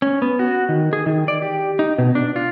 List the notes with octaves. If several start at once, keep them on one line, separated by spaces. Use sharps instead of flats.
C#4
B3
F#4
D#3
G#4
D#3
D5
G4
D#4
B2
D4
F4